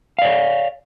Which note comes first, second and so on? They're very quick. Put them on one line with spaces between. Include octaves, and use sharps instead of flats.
F5 D5 C#5